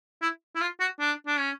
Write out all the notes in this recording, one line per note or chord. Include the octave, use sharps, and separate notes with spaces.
E4
E4
F4
F#4
D4
D4
C#4